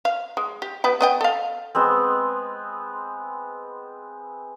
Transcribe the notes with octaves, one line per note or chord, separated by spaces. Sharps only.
F5
G#3
G4
B3 B4 G5
B3 D#5 G5
A4 F5
G#3 B3 C4